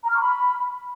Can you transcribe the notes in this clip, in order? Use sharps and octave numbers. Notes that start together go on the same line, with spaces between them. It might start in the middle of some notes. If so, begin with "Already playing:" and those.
A#5
F6
C#6
B5